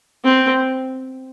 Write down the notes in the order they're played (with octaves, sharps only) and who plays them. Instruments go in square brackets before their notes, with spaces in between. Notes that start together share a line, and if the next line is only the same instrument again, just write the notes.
[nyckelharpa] C4